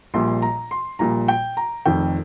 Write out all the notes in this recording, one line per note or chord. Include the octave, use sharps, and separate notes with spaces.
A#1 A#2 G3 C6
A#5
C6
A#1 A#2 G3 A#5
G5
A#5
F1 F2 D#3 G5